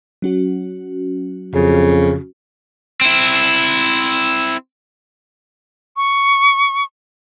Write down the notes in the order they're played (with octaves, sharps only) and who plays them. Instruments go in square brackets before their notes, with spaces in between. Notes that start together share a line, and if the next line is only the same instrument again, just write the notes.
[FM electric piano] F#3 C#4 F#4
[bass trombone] F2 [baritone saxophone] C#3
[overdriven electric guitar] C4 E4
[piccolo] C#6